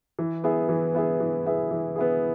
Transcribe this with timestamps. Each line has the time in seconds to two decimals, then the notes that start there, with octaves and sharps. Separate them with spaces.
0.19 E3
0.44 B3 E4 G#4
0.69 E3
0.94 B3 E4 G#4
1.20 E3
1.46 B3 E4 G#4
1.71 E3
1.96 B3 E4 G#4